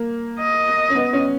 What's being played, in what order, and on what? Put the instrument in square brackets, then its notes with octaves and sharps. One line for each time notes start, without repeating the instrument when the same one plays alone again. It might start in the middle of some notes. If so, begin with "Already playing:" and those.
Already playing: [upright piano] A#3
[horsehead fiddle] D#5
[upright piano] C#4
B3
C#4